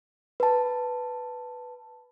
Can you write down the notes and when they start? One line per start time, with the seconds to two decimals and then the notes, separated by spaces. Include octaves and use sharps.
0.40 B4 A5